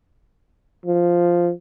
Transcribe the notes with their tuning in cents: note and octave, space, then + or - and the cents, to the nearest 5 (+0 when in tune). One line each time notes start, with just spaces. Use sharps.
F3 -5